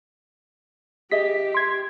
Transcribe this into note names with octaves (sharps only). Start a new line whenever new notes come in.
G4 G#4 D#5 E5 B6
C6 G#6